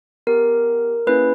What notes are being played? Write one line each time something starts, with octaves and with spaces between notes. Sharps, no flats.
B3 G4 A#4
A#3 C#4 E4 G#4 B4